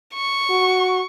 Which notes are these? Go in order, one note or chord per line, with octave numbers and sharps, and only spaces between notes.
C#6
F#4